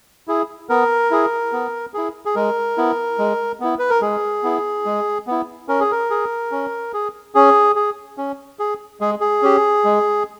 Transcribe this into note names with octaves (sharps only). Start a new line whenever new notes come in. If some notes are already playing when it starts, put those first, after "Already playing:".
E4 G#4
B3 A#4
E4 G#4
B3
E4 G#4
G#4
G#3 A#4
B3 E4
G#3
B3 E4
B4
A#4
G#3 G#4
B3 E4
G#3
B3 E4
C#4 A#4
G#4
A#4
G#4
C#4
G#4
C#4 G#4
G#4
C#4
G#4
G#3 G#4
G#4
C#4 G4
G#3